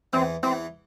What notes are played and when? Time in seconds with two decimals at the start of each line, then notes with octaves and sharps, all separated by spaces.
0.13 E2 E3 C4
0.43 E2 E3 C4